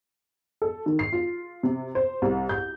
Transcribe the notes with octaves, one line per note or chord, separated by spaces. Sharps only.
A4
D#3
C7
F4
C3
C5
C2
G6